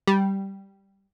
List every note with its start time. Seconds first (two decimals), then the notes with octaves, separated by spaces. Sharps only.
0.07 G3